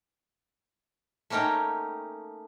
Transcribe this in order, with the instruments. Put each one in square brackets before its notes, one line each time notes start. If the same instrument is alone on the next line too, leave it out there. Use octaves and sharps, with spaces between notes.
[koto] A3 A#3 C#4 D#4 G5